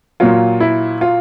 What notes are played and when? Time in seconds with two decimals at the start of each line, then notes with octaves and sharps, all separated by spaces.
0.20 A#2 F#3 F4
0.60 E4
1.01 F4